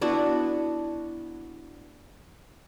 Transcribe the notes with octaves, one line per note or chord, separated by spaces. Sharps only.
B3 D4 E4 F#4